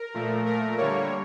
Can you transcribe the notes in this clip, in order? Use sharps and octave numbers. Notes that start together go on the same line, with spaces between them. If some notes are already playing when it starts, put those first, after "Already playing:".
Already playing: A#4
A#2 F3 A3
A#2 A3 A#4
D3 G3 A#3 C#5